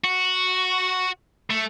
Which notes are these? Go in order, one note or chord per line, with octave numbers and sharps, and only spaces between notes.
F#4
A3